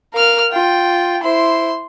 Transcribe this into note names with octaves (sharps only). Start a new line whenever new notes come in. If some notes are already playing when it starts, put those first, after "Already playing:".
A#4 F5 F6
F4 G5
E4 C5 C6